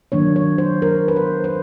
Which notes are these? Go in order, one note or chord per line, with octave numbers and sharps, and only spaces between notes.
D#3 F#3 A#3 D4 C#5
C#5
C5
A#4
B4
C5
C5